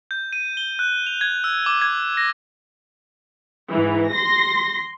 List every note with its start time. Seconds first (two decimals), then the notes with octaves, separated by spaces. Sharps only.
0.11 G6
0.33 D#7
0.57 G7
0.79 F#6
1.06 F7
1.21 G#6
1.44 E6
1.66 D6
1.82 G#6
2.17 A#6
3.71 G#2 E3
4.12 C6 A#6